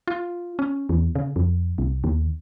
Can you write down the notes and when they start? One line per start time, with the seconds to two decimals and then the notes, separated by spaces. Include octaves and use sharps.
0.07 F4
0.59 C#4
0.89 E2
1.15 C#3
1.36 F2
1.78 C2
2.04 D#2